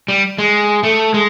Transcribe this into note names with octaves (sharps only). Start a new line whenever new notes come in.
G3
G#3
A3
G#3